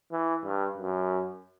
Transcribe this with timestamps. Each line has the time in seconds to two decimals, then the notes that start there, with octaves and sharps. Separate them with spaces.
0.12 E3
0.45 G2
0.77 F#2